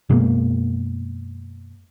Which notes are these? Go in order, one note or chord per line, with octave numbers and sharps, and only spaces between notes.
F#2 B2 G#3 A#3